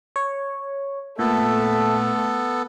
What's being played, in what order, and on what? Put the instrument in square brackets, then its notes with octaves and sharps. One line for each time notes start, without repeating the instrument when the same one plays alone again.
[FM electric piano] C#5
[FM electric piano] A#2 [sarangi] A3 [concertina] B3 A4